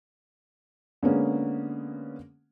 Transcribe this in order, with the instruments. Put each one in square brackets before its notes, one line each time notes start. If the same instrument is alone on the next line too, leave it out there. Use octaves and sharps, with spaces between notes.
[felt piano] D3 G#3 A#3 B3 C#4